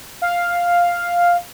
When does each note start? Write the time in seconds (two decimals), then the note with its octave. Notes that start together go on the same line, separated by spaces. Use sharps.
0.22 F5